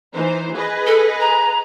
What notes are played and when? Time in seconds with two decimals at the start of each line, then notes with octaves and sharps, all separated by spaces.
0.15 E3 D#4 C5
0.55 G#4 B4 D#5
0.87 A4
1.21 A#5